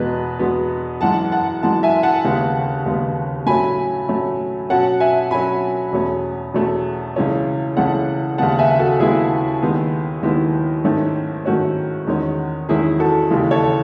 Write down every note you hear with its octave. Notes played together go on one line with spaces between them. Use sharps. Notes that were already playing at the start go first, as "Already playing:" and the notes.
Already playing: E2 B2 G#3 B3 B4 D#5
E2 B2 G#3 B3
F#2 E3 G#3 F#5 A5
F#5 A5
F#2 E3 G#3 F#5 A5
E5 G#5
F#5 A5
D#2 C#3 G#3 B3
D#2 C#3 G#3 B3
A2 F#3 A3 C#4 G#5 B5
A2 F#3 A3 C#4
B2 F#3 C#4 F#5 A5
E5 G#5
B2 F#3 C#4 G#5 B5
E2 B2 A3 C#4
E2 B2 A3 C#4
C#2 C#3 E3 A3 C#4
C#2 C#3 E3 A3 C#4 F#5 A5
D#2 C#3 G#3 B3 F#5 A5
E5 G#5
F#4 A4
D#2 C#3 G#3 B3 E4 G#4
D#2 D#3 G#3 B3
D#2 D#3 G#3 B3 E4
G#2 D#3 A3 C#4
G#2 D#3 A3 C#4 F#4
E2 D#3 G#3 C#4
E2 D#3 G#3 C#4 E4 G#4
F#4 A4
D#2 C#3 E3 G#3
A4 C#5